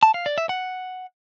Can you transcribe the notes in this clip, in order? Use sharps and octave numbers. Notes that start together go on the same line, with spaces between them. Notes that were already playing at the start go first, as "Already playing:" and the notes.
A5
F5
D5
E5
F#5